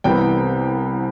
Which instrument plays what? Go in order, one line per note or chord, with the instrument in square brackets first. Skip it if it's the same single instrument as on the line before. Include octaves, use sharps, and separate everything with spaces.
[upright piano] C2 C3 E3 G3 B3 G5